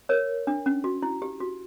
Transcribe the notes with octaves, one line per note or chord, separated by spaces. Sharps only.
A#4 C#5
D4
C#4
F#4
E4
G4
F#4